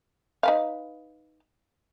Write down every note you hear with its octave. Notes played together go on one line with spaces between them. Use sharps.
D#4 B4 F5